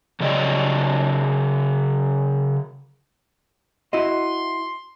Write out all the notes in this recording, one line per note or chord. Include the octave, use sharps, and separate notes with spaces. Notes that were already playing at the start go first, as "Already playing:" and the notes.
C#3 F#3 D5 D#5 G5
E4 F#4 D#5 C6